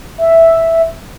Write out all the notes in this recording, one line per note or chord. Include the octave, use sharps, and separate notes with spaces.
E5